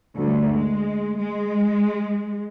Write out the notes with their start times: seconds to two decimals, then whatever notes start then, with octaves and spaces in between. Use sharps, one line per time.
0.16 D2 G2
0.55 G#3
1.18 G#3